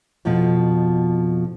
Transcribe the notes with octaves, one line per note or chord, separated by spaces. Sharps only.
F2 B2 F3